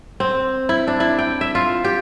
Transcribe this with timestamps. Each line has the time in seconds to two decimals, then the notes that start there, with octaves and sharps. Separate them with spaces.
0.20 C4
0.69 E4
0.87 D4
1.00 E4
1.19 G5
1.41 E5
1.55 F4
1.84 G4